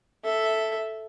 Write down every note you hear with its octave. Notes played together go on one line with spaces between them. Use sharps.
A4 E5